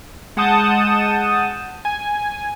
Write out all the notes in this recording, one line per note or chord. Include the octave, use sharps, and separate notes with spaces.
G#3 F#5 A5 D#6 G6 E7
G#5